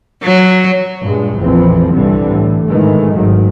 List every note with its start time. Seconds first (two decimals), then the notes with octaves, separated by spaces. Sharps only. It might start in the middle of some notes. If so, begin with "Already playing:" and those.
0.24 F#3
1.00 G2 A#2 G#3
1.39 A#1 F2 E3 F3 C4
1.92 C2 G2 D3 E3 G3
2.30 A2
2.67 G#2 D#3 E3 G#3 A3
3.14 G#1 G#2 D#3 F#3